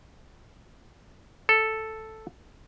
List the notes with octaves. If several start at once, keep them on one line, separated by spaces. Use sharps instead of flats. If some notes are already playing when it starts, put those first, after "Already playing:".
A4